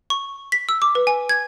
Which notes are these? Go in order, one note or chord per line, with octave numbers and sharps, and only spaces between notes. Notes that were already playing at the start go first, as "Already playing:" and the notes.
C#6
B6
E6
D6
B4
G#5
G#6